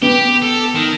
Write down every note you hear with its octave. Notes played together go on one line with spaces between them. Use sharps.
B3 G4
A4
D#3